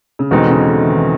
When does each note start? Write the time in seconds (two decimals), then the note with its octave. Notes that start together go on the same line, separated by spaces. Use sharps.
0.19 C#3
0.31 E2 B2 D3 G#3 C4 D#4
0.43 D3
0.50 C#3
0.69 D3
0.80 E3
0.89 D#3